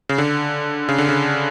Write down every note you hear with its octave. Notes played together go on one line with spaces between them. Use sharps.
C#3
D3
C#3
D3
C#3